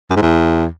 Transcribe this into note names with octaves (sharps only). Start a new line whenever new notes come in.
F#2
G#2
E2